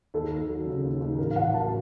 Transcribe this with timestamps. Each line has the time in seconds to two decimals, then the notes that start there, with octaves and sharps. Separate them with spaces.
0.14 D#2 A4
0.31 D#2
0.49 F#3
0.67 C#3
0.84 D#2
1.01 D#2
1.19 A1 A#4
1.31 F5
1.36 A1 F#5
1.53 F#3 A5